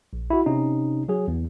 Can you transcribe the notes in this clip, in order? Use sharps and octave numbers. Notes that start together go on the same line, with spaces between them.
A#1
E4 F#4
C3 C#4 D#4
F#3 G#4
E2